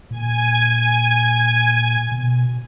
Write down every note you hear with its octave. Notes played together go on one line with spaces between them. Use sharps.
A#2 G#5
B2